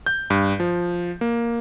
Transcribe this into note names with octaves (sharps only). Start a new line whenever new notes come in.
G6
G2
F3
A#3